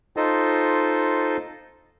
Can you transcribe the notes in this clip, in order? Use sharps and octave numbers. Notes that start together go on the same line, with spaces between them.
D#4 F4 A4 C5 D#5